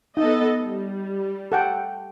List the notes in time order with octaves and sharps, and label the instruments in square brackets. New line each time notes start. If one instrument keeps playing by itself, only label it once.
[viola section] B3 A4 D#5 [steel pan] D#4
[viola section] G3
[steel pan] A4 F#5 G5